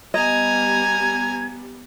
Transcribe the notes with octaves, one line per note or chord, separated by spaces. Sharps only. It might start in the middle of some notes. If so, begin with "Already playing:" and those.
G3 B3 D#5 G#5 A#5 G#6